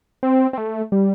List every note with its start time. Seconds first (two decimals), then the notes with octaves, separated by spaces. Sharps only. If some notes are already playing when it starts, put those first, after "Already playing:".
0.23 C4
0.53 C4
0.58 A3
0.92 G3